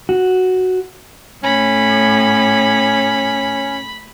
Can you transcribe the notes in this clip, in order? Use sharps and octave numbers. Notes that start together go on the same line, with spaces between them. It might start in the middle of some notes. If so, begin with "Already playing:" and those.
F#4
A2 C#4 B5